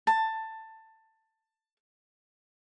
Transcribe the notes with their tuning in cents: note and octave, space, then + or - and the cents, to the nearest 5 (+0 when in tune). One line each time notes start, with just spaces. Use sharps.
A5 +15